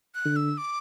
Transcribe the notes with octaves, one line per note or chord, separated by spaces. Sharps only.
F#6
D3
E6
D6